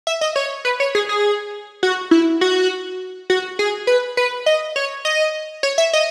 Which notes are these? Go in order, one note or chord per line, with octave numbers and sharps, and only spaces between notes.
E5
D#5
C#5
B4
C#5
G#4
G#4
F#4
E4
F#4
F#4
G#4
B4
B4
D#5
C#5
D#5
C#5
E5
D#5